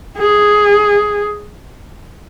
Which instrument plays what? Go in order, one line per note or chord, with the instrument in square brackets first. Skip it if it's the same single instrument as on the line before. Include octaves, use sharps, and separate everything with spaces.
[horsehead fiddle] G#4